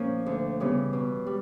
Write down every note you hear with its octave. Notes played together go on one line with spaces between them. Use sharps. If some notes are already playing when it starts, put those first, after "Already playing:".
Already playing: A#2 F3 A#3 C#4
D2
C#3 E3 G3 B3
B2
G3